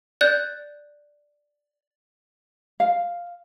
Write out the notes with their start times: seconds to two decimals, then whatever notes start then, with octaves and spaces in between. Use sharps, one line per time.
0.21 D5 F#6 G6
2.80 F5